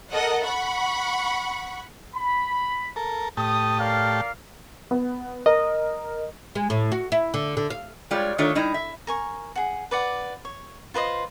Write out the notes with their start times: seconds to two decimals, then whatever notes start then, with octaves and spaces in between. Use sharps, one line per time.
0.12 A4 A#4 D#5 F#5
0.41 F#5 B5 C#6
2.15 B5
2.96 A4 A#4
3.37 A2 G4 A5 D#6
3.79 A#4 D5 F5
4.91 B3
5.46 A#4 D#5
6.55 G#3
6.70 A2
6.92 F#4
7.12 E4
7.34 D3
7.57 D3
7.70 F5
8.11 G3 G#3 F4 G4 C#5 D5
8.38 D#3 A3 D4 F4 C#5
8.55 G3 D#4 E4
8.74 E5
9.07 A#4 G#5 C#6
9.56 G#4 F#5
9.91 B4 D5 F#5
10.45 C#5
10.94 F4 B4 C5 D#5